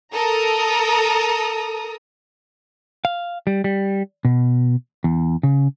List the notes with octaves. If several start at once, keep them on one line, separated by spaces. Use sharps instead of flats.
A4 A#4 A#5 D#6
F5
G3
G3
B2
E2
C#3